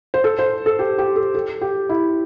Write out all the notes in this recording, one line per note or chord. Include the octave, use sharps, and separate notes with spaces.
C5
A4
C5
A4
G4
G4
A4
A4
G4
E4